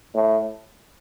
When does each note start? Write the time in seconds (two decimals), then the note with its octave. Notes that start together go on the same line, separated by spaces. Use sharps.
0.15 A2